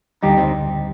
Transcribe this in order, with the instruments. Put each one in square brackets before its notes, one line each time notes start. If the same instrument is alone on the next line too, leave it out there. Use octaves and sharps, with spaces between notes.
[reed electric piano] D2 D3 G3 [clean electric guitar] D#4 G4
[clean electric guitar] C4 D#4